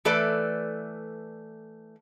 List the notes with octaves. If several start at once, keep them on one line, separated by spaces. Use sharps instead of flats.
E3 A3 A4 B4 D5